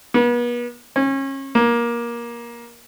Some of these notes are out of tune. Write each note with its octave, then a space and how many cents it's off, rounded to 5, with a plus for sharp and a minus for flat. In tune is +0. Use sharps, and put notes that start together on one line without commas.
B3 -40
C#4 -30
A#3 +20